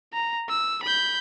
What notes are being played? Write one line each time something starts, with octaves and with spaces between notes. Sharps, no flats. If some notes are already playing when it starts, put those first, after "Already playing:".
A#5
E6
B5 G6